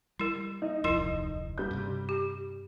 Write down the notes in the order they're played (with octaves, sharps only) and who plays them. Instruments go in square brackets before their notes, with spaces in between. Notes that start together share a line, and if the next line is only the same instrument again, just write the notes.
[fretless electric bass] G3 [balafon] E4 A#4
[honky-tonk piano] D#4 D#5
[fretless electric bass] D1 C2 F2 [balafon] E4 A#4 C6
[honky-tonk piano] G3 G6
[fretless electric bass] G2 C3
[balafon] G4